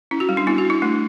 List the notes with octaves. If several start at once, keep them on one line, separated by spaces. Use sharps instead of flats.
C#4 E4
F#4
G3
D4
B3 E4
F#4
D4 E4
A3 D4